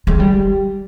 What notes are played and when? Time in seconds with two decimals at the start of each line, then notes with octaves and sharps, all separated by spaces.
0.07 G#3
0.20 G3